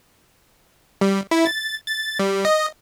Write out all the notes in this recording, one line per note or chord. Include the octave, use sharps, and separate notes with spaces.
G3
E4
A6
A6
G3
D#5